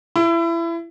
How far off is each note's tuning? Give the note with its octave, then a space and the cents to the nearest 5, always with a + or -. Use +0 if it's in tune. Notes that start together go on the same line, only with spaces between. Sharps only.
E4 +25